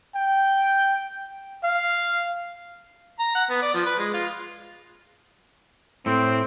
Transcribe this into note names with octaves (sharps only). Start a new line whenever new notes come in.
G5
F5
A#5
F#5
B3
D5
F3
B4
G#3
F4
A2 C4